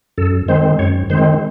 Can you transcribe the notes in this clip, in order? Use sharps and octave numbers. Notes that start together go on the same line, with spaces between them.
F#2 A4
D#3 G#3 C4 C5
F#2 C#5
D#3 G#3 C4 C5